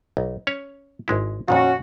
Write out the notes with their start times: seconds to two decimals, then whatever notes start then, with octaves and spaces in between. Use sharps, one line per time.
0.17 B1
0.47 C#4 C#5
1.08 G#1 G#3 E4
1.48 F2 A#2 D#3 C#4 F#4